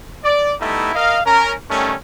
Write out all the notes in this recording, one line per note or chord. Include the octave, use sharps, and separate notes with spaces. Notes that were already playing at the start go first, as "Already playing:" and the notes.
D5
G3 A3 B3 D#4 E4
A#4 D#5 F5
C#4 A#4
D#3 G3 A3 C#4